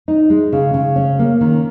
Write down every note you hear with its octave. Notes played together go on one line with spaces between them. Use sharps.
D#4
G#3
C#3
C#3
C#4
A#3
D#3